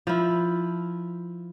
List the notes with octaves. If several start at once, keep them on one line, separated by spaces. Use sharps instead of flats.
F3 E4